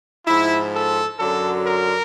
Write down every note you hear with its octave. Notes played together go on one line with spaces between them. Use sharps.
G#2 F3 E4
A4
F#2 D3 F#3 A4
A#4